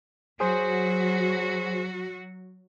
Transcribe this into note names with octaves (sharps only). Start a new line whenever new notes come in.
F#3 F#4 G#4 C5